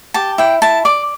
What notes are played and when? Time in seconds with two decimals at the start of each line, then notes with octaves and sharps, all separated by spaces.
0.14 G4 A5
0.38 E4 G5
0.62 E4 A5
0.85 D5 D6